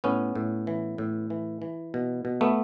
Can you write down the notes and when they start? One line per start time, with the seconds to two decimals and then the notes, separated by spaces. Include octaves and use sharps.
0.04 A2 B3 C#4
0.35 A2
0.67 E3
0.98 A2
1.30 E3
1.62 E3
1.94 B2
2.25 B2
2.41 A3 B3